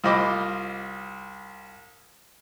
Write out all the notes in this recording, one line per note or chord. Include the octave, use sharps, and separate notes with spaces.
C2 F4 C5 D#5 B5 D6